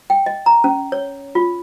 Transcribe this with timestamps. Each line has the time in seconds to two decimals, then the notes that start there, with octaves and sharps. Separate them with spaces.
0.10 G5
0.26 D#5
0.46 A#5
0.64 C#4
0.92 C#5
1.35 F4